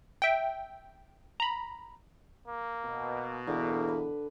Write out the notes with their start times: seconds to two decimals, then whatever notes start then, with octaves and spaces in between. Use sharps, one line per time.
0.22 E5 G5
1.40 A#5 B5
2.48 A#3
2.85 B2
3.47 E2 D3 A#3
3.88 B4